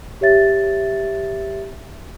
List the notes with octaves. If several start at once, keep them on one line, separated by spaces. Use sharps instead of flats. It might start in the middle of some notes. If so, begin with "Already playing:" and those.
G4 C#5 E5 A6